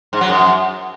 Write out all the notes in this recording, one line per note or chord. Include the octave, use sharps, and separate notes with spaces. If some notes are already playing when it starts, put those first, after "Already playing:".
G#2
F#3
F#2